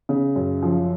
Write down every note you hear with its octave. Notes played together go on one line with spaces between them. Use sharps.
C#3
F#2
F3